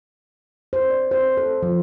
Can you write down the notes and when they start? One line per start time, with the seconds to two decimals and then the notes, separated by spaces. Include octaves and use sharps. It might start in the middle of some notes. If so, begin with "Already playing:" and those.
0.73 C5
0.90 D5
1.11 C5
1.37 A4
1.63 F3